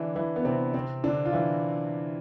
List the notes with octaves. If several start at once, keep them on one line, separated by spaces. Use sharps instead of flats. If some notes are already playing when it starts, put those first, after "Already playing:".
Already playing: D3 E3 D4 E4
E3 E4
B3
C3 C4
C3 C4
D3 D4
F4
E3 E4